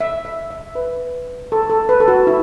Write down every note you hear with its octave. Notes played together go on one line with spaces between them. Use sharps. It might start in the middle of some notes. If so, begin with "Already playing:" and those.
E5
E5
E5
B4
A4
A4
B4
A4
F#4
E4